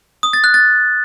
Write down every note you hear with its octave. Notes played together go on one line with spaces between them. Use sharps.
D#6
A6
F#6
A6